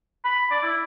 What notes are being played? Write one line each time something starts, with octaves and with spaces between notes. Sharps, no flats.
B5
D5
E4